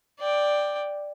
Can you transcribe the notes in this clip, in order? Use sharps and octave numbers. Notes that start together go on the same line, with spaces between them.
D5 G5